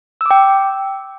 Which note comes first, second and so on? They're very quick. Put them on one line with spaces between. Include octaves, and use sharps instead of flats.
E6 D6 G5